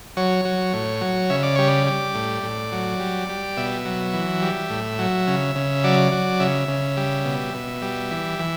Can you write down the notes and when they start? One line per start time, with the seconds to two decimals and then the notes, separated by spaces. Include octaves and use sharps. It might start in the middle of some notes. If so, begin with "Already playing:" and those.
0.17 F#3 C#5
0.45 F#3
0.73 A2
1.01 F#3
1.30 C#3 E5
1.43 D5
1.56 G3 C#5
1.68 D5
1.87 G3
2.15 A2
2.43 A2
2.72 F#3
3.00 G3
3.29 G3
3.57 B2 E5
3.85 F#3
4.13 E3
4.42 G3
4.70 A2
4.99 F#3
5.27 C#3
5.56 C#3
5.84 F#3 D5
6.12 F#3
6.40 C#3 E5
6.68 C#3
6.97 G3
7.25 B2
7.54 B2
7.82 G3
8.11 E3
8.39 E3